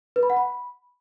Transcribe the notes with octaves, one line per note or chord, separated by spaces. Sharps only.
B4
B5
F#5
B5